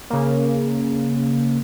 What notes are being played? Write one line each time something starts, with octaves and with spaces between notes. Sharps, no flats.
C#3 A#3